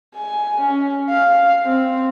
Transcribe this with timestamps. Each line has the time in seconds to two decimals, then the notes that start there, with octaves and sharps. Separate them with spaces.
0.15 G#5
0.61 C#4
1.10 F5
1.64 C4